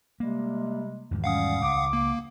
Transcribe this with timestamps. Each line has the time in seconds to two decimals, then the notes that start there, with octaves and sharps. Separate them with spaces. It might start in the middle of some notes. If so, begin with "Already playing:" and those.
0.20 C3 G3 G#3 A#3
1.11 E2 G#2 D#3
1.24 G3 C#4 F5 F#5 D#6
1.62 C#2 D6
1.93 A#3